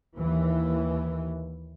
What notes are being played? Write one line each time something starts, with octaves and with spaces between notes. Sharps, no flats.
D#2 E3